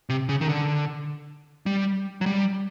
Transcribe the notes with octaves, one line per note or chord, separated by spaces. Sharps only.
C3
C#3
D#3
D3
G3
F#3
G3